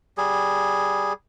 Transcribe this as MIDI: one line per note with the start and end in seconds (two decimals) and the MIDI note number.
0.18 1.13 55
0.18 1.13 68